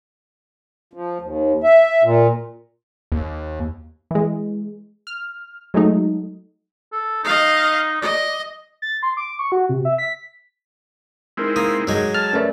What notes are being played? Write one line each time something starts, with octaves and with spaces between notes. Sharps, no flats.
F3
D#2
E5
A#2
D#2
E3 G#3
F6
F#3 G#3 A3 D#4
A4
D#4 D#5 F5
D5 D#5
A6
C6
D6
C#6
F#4
C3
E5
B6
G#3 C4 D#4 E4 A#4 F6
A#3 D#6
G2 F#3 G#3
A4 A5 F6
A3 C#4 A#4 B4 D5